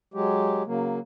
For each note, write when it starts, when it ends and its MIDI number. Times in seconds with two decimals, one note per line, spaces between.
0.14 0.63 54
0.14 0.63 56
0.14 0.63 67
0.66 0.99 49
0.66 0.99 54
0.66 0.99 58